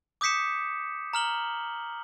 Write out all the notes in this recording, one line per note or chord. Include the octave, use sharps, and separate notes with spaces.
D6 D#6 G6 B6 C#7 E7
A#5 F6 F#7 G7